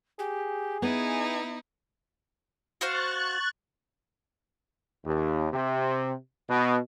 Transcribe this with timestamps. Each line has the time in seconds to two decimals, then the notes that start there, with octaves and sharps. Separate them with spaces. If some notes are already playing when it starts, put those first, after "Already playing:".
0.19 G4 G#4
0.82 B3 D#4 E4 G#5
2.81 F#4 C5 F5 C#6 F#6 A6
5.05 D#2
5.52 C3
6.49 B2